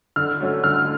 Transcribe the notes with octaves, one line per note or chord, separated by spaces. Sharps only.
D3 F6
F#3 A3 C#4
D3 F6